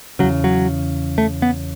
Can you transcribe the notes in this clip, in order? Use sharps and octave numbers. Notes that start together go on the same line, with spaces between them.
E2 C#3 F#3
F#3
A3
B3